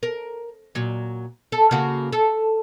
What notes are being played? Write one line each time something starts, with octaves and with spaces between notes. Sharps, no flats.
A#4
A#2 F#3
A4
C#3 A#3 F#4
A4